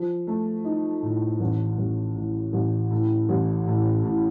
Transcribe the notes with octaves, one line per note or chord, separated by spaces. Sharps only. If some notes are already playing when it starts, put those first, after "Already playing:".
Already playing: F3
A3
D#4
A2
A1
A1
A2
A1
A2
A1
A2
A2